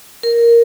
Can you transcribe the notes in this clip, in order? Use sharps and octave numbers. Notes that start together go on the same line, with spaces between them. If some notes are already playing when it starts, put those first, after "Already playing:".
A#4